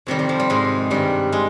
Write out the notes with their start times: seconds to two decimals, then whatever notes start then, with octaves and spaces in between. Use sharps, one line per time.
0.07 F2 C3 D#3 G3
0.19 G3
0.29 F3
0.40 G3
0.50 G#2 G#3
0.91 G2 D#3 G3
1.32 G#3